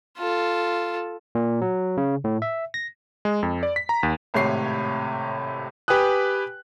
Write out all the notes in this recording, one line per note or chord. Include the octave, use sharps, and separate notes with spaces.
F4 A4
A#2
F#3
C#3
A2
E5
A#6
G#3
F2
D5
B6
A#5
D#2
G#1 A2 C3 C#5 C7
G4 B4 G5 G#5 D#6 F#6